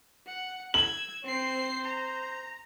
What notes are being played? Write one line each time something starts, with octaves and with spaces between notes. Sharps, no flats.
F#5
E6 G#6 F#7
C4 C5 C7
A#5